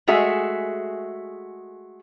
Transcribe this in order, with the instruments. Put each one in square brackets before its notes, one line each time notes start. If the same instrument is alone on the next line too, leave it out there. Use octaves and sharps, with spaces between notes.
[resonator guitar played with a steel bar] G#3 A3 F#4 G#4 E5